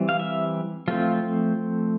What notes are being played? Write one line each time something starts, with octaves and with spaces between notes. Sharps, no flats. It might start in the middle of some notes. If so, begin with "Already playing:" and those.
Already playing: E3 G3 C4
F5
E5
F3 A3 C4 F4